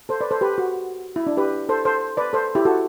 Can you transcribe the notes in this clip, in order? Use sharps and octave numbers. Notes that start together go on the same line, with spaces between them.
A4 C5
B4 D5
A4 C5
G4 B4
F#4
E4
D4
G4 B4
A4 C5
A4 C5
B4 D5
A4 C5
E4 G4
F#4 A4